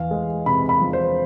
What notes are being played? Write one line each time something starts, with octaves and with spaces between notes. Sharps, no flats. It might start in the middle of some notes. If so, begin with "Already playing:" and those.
Already playing: E2 F5
G#3
C3 B5
B5
F3
C5